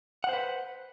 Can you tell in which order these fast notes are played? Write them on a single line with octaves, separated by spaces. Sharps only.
F#5 C5 B4